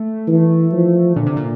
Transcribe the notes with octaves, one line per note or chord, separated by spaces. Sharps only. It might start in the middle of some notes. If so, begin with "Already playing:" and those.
Already playing: A3
E3
F3
A#2 D3
C3
A#2